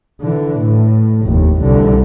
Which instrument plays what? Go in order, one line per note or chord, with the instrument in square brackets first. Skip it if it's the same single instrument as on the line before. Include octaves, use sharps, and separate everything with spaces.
[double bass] D3 E3
A2
F1 D#2
C2 D3